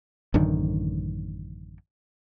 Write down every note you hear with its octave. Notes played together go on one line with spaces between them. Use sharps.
A1 F#2 D3 D#3